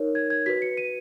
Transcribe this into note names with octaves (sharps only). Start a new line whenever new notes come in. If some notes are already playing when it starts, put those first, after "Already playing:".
Already playing: D#4 A#4 C#5
G#6
G#6
F#4 B4 B6
C#7
D#7